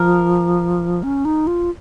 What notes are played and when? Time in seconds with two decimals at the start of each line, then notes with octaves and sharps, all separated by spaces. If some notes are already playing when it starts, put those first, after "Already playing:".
Already playing: F3 A#4
1.03 C#4
1.25 D#4
1.47 F4